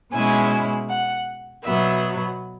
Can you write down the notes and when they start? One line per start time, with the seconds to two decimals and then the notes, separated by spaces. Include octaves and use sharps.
0.13 B2 G#3 C#4 E4 G#5
0.88 F#5
1.64 B2 F#3 B3 E5